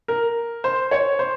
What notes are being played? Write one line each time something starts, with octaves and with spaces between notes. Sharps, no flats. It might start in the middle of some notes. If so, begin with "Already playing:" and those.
A#4
C5
C#5
C5